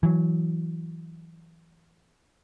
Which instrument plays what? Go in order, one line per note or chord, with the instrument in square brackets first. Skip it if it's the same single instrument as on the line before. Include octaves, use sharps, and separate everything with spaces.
[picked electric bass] E3 F#3